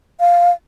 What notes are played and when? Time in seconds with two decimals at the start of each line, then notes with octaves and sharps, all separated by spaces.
0.20 F5